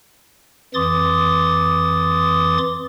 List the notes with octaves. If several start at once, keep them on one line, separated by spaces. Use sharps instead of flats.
F2 E3 C6 D6 D#6 A6